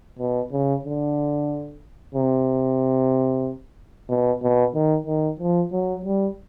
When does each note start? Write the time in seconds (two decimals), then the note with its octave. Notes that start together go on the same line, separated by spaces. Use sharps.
0.19 B2
0.52 C#3
0.85 D3
2.15 C3
4.10 B2
4.42 B2
4.75 D#3
5.07 D#3
5.39 F3
5.72 F#3
6.05 G3